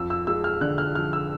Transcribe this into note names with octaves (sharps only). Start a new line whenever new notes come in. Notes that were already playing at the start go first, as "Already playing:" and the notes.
Already playing: F2 E6
E6
G#3 E6
F6
D3 F#6
F6
F3 F6
E6